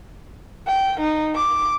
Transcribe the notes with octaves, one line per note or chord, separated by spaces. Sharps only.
G5
D#4
D6